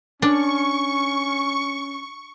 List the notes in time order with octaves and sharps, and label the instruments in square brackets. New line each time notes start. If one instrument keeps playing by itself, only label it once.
[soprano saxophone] C#4 [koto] D4 [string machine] C#6